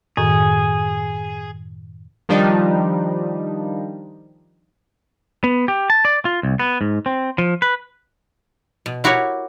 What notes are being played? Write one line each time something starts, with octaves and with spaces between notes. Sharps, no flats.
F#2 A2 D#3 G#4
D#3 F3 G3 D4 D#4
B3
G4
A5
D5
F4
C2
B3
G#2
C4
F3
B4
B2
E4 F#4 G4 A#4 C#5